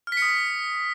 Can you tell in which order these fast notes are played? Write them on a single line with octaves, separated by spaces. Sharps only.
F6 B6 C#7 D#6